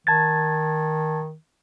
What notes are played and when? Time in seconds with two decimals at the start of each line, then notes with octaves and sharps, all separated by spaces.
0.07 D#3 A5 G#6 A6